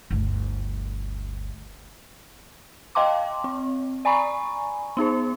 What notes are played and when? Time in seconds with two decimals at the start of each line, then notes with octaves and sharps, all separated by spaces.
0.10 G1 D2
2.95 D#5 F5 G5 A5 C6 D6
3.44 C4
4.05 D5 G#5 A#5 B5 C#6
4.97 B3 D#4 G#4 C5